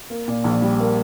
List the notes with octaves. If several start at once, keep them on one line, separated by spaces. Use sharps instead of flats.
A#3
A#2
A#1
G3
A#3